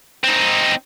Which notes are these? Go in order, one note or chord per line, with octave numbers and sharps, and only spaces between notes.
C4 D#4